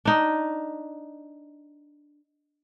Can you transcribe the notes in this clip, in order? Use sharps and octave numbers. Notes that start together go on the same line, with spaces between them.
D4 D#4